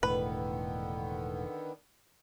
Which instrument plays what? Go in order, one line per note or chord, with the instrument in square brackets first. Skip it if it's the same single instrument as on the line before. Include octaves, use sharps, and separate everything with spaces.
[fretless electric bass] E1 A2 [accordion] D3 D#3 B3 [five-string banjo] B4